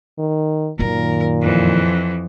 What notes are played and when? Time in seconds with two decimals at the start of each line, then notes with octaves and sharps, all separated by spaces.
0.19 D#3
0.79 F#2 A#2 D#3 A#4
1.42 F2 E3